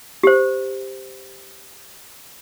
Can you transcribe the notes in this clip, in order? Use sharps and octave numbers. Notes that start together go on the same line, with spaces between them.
G4 C5